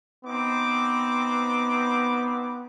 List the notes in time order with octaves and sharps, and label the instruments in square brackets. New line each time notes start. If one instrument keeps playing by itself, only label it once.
[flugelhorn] B3 [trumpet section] C4 D#4 D6